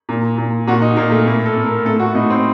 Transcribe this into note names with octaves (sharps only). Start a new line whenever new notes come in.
A#2
A#2
A#2 F#4
D#4
A#2 A#3
A3
A2 A#3
A4
A2
A#4
A2 A4
F#4
A2 D#4
C4